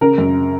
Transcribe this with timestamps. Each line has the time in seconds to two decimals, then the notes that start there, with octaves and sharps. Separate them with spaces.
0.01 C#3 A#4
0.18 F#2